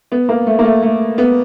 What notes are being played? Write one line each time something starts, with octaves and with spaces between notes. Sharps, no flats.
B3
A#3
A3
A#3
A3
A3
B3